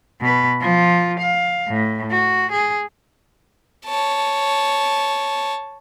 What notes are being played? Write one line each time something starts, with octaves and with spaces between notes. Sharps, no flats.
B2 B4
F3 F4
F5
A2
F#4
G#4
C#5 A5